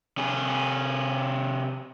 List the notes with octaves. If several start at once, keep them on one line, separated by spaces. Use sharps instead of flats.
C3 G#4